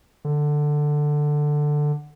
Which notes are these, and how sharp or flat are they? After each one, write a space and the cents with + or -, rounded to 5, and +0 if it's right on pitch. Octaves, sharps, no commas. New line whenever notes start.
D3 +10